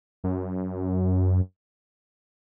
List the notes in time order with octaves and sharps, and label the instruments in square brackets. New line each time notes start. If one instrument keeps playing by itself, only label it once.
[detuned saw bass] F#2